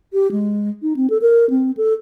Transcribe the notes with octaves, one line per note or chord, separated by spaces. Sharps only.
G4
G#3
D#4
C4
A4
A#4
C4
A4